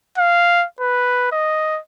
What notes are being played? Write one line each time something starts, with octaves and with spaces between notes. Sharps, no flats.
F5
B4
D#5